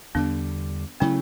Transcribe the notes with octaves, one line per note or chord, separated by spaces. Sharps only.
E2 D3 G3 B3 D4
C#3 F#3 A3 C#4 E4